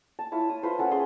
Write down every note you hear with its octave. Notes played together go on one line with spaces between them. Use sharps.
A5
E4 F4 C#5
D#6
F4 B4 C5
C#4 A4 F#5
C#4 G#4 C6